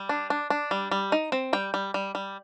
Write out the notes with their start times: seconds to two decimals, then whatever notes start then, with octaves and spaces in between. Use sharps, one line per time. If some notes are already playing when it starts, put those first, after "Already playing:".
Already playing: G3
0.09 D4
0.30 D4
0.50 D4
0.71 G3
0.91 G3
1.12 D#4
1.32 C4
1.53 G3 G5
1.74 G3
1.94 G3
2.15 G3